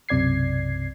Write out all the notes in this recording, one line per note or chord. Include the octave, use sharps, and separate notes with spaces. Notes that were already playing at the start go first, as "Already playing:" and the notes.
B1 F#2 C3 D5 G#6 C7